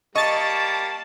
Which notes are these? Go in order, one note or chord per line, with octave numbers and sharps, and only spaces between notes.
G3 A#3 D#5 A5 C#6 A6